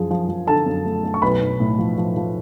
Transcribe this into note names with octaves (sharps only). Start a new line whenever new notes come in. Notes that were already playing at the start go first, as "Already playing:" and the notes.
Already playing: F#2 F3 G#4
F3
F3
D3 A4 A5
F#2
A3
A3
C#6
B1 B4 B5
B1
A2
F3
F3
F3